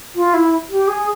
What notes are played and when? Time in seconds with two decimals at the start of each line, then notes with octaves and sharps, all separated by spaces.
0.15 F4
0.34 E4
0.70 G4
0.87 G#4